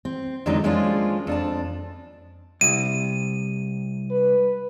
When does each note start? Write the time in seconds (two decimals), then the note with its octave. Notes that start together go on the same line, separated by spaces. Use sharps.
0.05 C4
0.46 F2 D3 F#3 G#3 D4 D#4
0.64 F3 G#3 A#3 C#4 D4 F4
1.27 F2 D4 A5
2.61 C2 D#7
4.11 B4